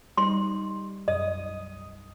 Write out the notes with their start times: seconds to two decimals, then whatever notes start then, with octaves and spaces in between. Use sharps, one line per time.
0.17 G3 D#4 C6
1.08 B1 F#2 D#5 D#6